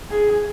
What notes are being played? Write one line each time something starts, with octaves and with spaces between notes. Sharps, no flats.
G#4